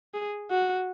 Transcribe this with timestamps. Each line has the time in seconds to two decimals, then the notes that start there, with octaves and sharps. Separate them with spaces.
0.14 G#4
0.51 F#4